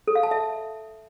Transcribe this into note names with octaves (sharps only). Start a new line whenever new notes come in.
A4
F5
A5
E5